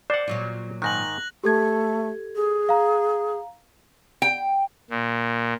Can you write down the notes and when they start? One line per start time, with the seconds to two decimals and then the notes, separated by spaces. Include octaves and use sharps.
0.10 C5 D5 F#5
0.28 A#2 F#3 F4
0.82 G#2 D#3 F#6 A#6 F#7
1.44 A3 G4 A4 G#6
2.35 G#4
2.69 F5 A#5
4.22 G5
4.90 A#2